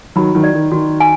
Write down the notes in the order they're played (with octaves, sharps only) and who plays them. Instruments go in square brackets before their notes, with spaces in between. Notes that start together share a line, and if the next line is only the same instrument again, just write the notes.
[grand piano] D#3 F#3 [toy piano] B5
[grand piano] D#3 F#3
[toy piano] D5
[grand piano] D#3
[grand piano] D#3 [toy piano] F#4
[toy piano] G#5